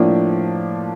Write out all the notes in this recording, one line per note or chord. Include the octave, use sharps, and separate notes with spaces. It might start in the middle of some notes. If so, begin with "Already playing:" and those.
Already playing: A2 F3 A#3 D4